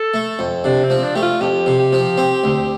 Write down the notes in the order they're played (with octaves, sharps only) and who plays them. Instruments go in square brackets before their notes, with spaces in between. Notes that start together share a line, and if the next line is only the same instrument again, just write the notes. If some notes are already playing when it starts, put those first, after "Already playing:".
Already playing: [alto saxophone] A4
[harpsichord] A3
F2
[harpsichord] C3 [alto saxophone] D4
[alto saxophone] C4
[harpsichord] F3
[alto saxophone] D4
[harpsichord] A3 [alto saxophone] G4
[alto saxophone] F4
[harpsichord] F2 [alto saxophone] G4
[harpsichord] C3
[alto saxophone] G4
[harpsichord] F3
C4
D2